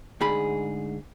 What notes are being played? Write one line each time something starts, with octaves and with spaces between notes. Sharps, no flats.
D2 G#2 G#4 B5